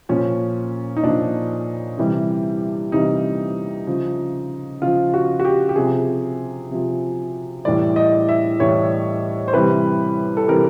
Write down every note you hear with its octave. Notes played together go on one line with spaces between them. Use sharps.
A#2 F3 C#4
D#4
A#2 F3 D4
C3 E3 G3
C3 E3 G3 D#4
C#3 F3
C#3 F3 F4
F#4
F#4
G4
G4
C3 F3 G#4
C3 F3
A2 E3 G3 D5
D#5
E5
A2 E3 G3 C#5
C5
C3 E3 G3 B4
A4
C3 E3 G3 A#4